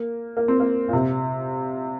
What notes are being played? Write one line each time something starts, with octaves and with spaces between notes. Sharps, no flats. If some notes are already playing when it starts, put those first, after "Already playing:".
Already playing: A#3
A#3
C4
A#3
A#2
C3